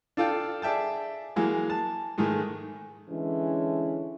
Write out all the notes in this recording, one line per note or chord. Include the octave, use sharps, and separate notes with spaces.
D4 F4 A4 F5 G5
G#4 D5 E5 G5 A5
E3 F#3 G#3 A#3
A5
G#2 D#3 G#3 A3
D3 E3 G#3 C#4